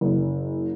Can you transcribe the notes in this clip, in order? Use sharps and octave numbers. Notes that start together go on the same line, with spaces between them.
F#1